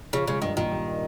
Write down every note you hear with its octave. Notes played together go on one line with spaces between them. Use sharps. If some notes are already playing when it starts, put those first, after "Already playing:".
C#3 F3
C#3 G#3
G2 D#3
A#2 D#3
G3